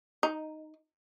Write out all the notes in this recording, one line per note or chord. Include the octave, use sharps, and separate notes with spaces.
D#4